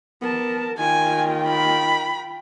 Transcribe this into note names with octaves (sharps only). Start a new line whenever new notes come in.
B3 A#4 A5
D#3 F4 G5 G#5
B5